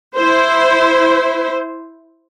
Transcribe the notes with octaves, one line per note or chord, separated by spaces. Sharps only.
E4 C5